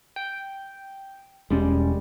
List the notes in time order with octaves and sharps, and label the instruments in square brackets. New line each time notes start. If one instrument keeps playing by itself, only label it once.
[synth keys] G5
[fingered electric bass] E1 C#4 [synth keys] G3 G#3